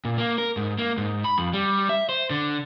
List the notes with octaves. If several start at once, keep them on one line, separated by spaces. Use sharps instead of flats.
A#2
A#3
A#4
G#2
A#3
G#2
B5
F2
G3
E5
C5
D3